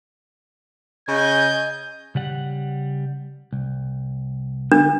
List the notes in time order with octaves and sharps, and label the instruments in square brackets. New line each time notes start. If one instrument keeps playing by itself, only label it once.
[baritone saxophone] C#3 [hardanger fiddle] D#5 G#5 [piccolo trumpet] G6
[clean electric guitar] C#3 G3 F#5
C2
[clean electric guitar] D3 [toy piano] D4